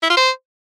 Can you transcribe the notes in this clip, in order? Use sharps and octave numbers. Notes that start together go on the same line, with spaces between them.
E4
F4
C5